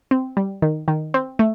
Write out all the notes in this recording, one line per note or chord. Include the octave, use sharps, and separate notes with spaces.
C4
G3
D#3
D#3
C4
A3